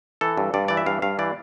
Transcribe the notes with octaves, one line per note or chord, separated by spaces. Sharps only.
E3 A4
G2
G2 D5
E3 D5
E5
G2 F5
G2 F5
E3 D5